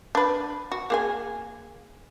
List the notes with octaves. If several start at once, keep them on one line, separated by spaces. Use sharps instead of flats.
D4 B4
F#4
A#3 G#4 G#5